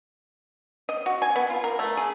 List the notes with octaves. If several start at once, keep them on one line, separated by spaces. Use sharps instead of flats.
D#5
F#4
G#5
B3
F4
A#4
A3
G#4